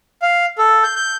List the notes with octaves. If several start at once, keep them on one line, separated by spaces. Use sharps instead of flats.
F5
A4
G6
G6